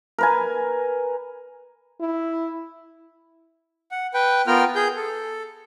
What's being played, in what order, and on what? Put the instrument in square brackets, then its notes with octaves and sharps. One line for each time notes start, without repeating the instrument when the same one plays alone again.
[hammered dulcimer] A#4 B4 G#5
[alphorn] E4
[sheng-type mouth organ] F#5
B4 G5
B3 F4 A#4 G5 F6
G#4 G6
A4